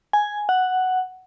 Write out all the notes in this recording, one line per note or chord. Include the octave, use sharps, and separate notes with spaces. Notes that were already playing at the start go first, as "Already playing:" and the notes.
G#5
F#5